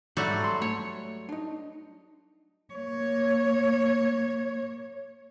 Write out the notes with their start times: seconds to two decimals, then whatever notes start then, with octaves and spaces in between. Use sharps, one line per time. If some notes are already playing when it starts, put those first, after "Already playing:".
0.17 G#2 F#3 G3 A3 F#4
0.44 C6
0.62 A3 C#5
1.29 D4 D#4
2.74 A#3 C#5